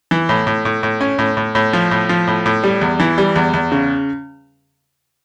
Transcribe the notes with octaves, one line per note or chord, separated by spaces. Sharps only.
E3
A2
A2
A2
A2
C#4
A2
A2
A2
F3
A2
F3
A2
A2
G3
E2
E3
G3
E2
E2
C#3